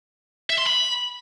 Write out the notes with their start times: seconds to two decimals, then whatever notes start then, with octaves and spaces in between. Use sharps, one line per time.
0.50 E5
0.58 C6
0.66 B5